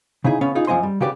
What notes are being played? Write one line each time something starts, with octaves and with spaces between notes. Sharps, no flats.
C#3 D#4 E4 G#4
C#3 B3 C#4
D#4 F4 G#4
F#2 F3 B3 D#5 G#5 C6
G3
C#3 F#4 G4 B4 D5